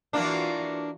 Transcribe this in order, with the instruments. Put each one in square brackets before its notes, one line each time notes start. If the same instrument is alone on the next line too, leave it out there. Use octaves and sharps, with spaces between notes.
[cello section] E3 F4 F#4 [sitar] A#3 D4